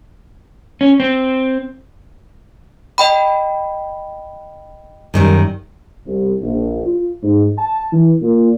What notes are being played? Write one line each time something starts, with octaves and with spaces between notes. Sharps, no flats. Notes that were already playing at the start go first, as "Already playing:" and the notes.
C#4
C4
D#5 G5 B5
F#2 D#3 G3
C2
A#1
F4
G#2
A5
E3
A#2